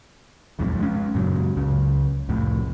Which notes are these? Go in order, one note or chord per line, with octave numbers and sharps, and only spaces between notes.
D#1 B1 F2 G#2
G#3 C#4
F#2 A#2 C#3 F#3
C#2 C#3
C2 F2 A2